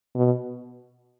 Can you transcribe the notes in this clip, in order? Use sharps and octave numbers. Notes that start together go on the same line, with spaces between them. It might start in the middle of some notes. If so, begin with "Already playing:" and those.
B2